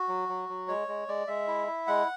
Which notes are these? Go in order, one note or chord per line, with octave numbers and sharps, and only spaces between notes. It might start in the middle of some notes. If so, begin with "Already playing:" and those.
Already playing: F#4
F#3
F#3
F#3
G#3 C#5
G#3
G#3 D5
G#3 E5
E4
E4
G#3 F#5